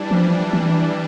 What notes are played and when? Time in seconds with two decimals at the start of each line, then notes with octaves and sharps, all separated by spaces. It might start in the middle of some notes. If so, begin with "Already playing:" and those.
Already playing: E3 G3 D4
0.11 F3
0.53 E3